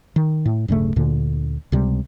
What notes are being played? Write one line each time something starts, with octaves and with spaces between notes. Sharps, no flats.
D#3
A2
D1 G2 C#3 A3
D2 A#2 D3
C#2 C3 G3